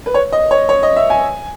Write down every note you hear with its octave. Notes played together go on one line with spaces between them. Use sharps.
B4
C#5
D#5
C#5
C#5
D#5
E5
G#5